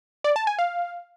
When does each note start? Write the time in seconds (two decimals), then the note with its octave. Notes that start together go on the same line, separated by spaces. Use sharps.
0.24 D5
0.36 A5
0.47 G#5
0.59 F5